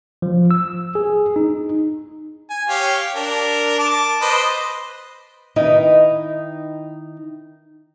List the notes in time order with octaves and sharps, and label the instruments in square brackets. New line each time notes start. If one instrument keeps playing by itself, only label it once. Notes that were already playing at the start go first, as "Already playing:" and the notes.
[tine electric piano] F3
E6
G#4
D#4
[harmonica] G#5
G4 C#5 F5
D4 A#4
A5 D6
B4 C5 D#5
[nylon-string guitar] D#3 D#4 E4 B4 D#5